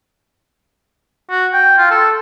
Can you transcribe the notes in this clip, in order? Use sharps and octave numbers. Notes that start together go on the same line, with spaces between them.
F#4
G5
F4
A4